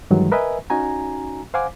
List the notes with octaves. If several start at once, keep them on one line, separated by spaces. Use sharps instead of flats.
G2 D#3 E3 F#3 G#3
A#4 B4 D#5 E5 G#5
C#4 D#4 F#4 G#5 A#5
C5 F5 F#5 G#5 D6